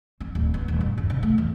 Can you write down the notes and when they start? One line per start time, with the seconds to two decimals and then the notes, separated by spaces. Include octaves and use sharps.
0.20 C4
0.35 D1
0.54 B3
0.68 D#1
0.81 F#2
0.97 D#2
1.10 C3
1.23 A3
1.38 E2